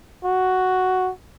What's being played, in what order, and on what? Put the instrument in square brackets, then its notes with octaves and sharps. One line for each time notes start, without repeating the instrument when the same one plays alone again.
[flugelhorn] F#4